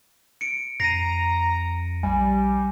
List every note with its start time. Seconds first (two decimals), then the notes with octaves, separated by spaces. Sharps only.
0.41 C#7 D7
0.80 F2 A#5 A#6 C7 D#7
2.03 A#1 G3 G#5